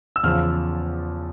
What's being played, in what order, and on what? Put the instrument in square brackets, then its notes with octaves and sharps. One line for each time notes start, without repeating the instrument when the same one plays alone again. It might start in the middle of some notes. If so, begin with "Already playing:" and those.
[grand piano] E6
E2 C#3 F3 F6